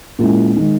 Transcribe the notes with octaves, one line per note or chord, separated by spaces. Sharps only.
A#2 G#3 C#4 E4
D#3 G#3 D#4